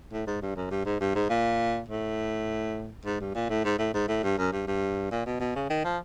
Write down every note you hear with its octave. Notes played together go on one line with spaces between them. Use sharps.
A2
G#2
G2
F#2
G2
G#2
G2
G#2
A#2
A2
G#2
G2
A#2
A2
G#2
A2
G#2
A2
G2
F#2
G2
G2
A#2
B2
B2
C#3
D#3
F3